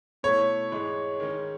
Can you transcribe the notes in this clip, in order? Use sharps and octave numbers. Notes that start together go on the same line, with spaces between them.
B2 A3 E4 C#5
G#2 E3 G#3 D#4
D#3 G#3 C#4